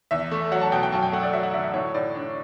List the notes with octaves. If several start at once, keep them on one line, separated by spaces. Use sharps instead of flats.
E2 E5
A3
F#3 F#5
A5
B2 G5
G5
F#2 A5
G5
A3 F#5
D5
F#3 E5
F#5
D3 E5
E5
A2 C#5
A2 D5
D4